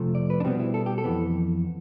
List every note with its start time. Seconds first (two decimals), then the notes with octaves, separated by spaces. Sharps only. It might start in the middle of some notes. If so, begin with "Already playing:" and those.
Already playing: F2 C3 F3 A3
0.15 D5
0.30 B4
0.40 D4
0.44 B2 G3 B3 C4
0.59 E4
0.74 A4
0.86 G4
0.98 A4
1.04 F2 E3 B3